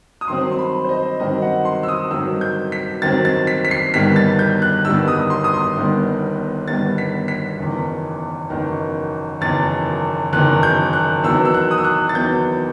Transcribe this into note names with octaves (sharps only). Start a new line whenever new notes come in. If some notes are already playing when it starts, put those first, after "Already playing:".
D#6
G2 D#3 F#3 C4 C6
C6
B5
C5
D#5
G2 D#3 F#3 C4 D#5
F#5
C6
E6
D#6
G2 D#3 F#3 C4 E6
G6
B6
G2 D#3 F#3 C4 A6
A6
B6
B6
C7
G1 G2 D#3 G3 B3 B6
A6
G6
F#6
G1 G2 D#3 G3 B3 E6
D#6
C6
D#6
C6
G1 G2 D#3 G3 B3
G1 G2 D#3 G3 B3 A6
B6
B6
F#1 E2 D#3
F#1 E2 D#3
F#1 E2 D#3 A6
F#1 E2 D#3 F#6
G6
F#6
E2 D#3 F#3 B3 E6
E6
F#6
D#6
E6
F#6
A6
E2 D#3 F#3 B3 G6